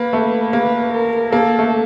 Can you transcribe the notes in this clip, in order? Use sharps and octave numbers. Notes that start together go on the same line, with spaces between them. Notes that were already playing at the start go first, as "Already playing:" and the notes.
Already playing: A#3 B4
A3
A#3 B4
A#4
A#3 A4
A3